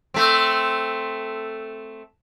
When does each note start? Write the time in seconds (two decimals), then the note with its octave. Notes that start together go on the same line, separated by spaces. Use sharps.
0.14 A3 C4